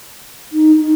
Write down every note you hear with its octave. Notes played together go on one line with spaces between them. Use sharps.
D#4
D#4